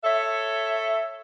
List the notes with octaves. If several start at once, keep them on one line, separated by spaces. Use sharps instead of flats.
A4 C#5 E5